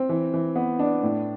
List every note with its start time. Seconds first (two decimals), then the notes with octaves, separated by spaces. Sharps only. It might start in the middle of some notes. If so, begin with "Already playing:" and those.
Already playing: C4
0.09 E3
0.34 E3
0.56 B3
0.79 D4
1.03 A2